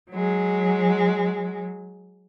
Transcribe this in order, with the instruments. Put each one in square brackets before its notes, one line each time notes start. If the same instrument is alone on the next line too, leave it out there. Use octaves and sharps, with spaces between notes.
[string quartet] F#3 G#3